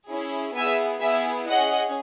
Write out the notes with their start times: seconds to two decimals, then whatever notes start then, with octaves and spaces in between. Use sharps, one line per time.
0.10 C#4 E4 G#4
0.56 B3 E4 G#4 E5 G#5
1.02 B3 E4 G#4 E5 G#5
1.48 C#4 G#4 D#5 F#5